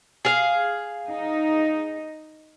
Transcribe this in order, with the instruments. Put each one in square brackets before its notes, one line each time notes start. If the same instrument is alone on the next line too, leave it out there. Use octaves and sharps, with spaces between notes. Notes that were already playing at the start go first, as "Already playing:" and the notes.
[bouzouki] G#4 F5
[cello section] D#4